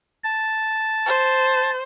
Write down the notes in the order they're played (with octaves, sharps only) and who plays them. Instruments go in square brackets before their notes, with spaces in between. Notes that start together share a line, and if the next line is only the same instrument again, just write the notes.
[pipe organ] A5
[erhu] C5